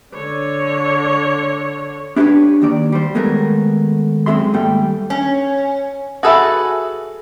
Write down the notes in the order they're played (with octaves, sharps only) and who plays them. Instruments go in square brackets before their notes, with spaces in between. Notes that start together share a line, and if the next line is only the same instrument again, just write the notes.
[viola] D3 C#5
[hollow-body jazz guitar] D4 E4 G4 A4 B4 C#5
D#2 D#3 D5
G3 C5
D#3 G#3 A3 B3 A#4 C#5
F#2 G#3 C4 G#4 E5 C6
D#2 G#2 G3 A3 G5
[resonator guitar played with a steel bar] C#4
[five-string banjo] F#4 G#4 A4 B4 E5